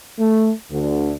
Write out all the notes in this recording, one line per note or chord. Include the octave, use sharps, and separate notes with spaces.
A3
D2 D3